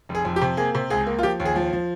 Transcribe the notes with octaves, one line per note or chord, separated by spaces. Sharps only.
F1
G#4
F2
G4
C3
A#3 G#4
C3
C#2 G#4
A#3
F4
F3 G4
D#2
G#4
F3
F3